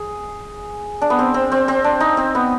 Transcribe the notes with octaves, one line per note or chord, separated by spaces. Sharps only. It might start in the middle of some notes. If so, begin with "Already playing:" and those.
Already playing: G#4
D4
B3
C4
C4
C4
C4
D4
D#4
C4
B3